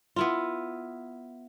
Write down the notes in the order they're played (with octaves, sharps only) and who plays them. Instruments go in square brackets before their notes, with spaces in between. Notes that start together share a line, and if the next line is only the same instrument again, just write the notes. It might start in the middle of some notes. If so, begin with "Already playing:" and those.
[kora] B3 E4 F4